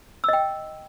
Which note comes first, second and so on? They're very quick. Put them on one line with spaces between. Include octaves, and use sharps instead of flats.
E6 D#5 G5